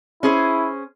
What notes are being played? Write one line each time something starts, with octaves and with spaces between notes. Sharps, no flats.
C#4 E4 G#4 C5